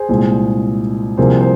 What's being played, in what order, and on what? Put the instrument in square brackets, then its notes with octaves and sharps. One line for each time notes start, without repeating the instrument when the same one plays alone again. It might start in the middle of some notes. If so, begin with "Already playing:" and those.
Already playing: [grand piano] G#4 C5
C2 A#2 G#3
C2 C3 F3 A#3 G#4 C5
C5